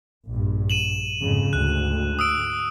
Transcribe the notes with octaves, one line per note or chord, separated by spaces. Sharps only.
A#1 G2
D#7 E7 F#7
F2 G#2 C#3
D2 G#2 F#6
D#6 E6 D7